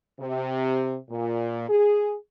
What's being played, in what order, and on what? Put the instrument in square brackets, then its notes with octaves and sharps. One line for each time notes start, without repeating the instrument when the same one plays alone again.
[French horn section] C3
A#2
G#4